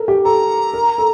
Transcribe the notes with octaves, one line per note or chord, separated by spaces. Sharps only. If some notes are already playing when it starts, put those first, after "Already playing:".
Already playing: A4 A#4
G4
A4 A#5
A#4
A4